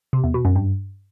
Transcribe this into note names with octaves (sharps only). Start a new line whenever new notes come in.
C3
E2
B2
F#2
G2